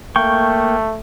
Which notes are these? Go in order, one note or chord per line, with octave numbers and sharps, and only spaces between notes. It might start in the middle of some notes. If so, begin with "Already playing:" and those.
A3 A#3 G5 C#6